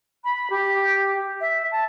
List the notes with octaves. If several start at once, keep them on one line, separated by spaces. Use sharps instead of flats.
B5
G4
E5
A5